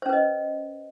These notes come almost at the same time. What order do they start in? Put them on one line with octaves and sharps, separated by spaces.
C5 C#4 B4 D#5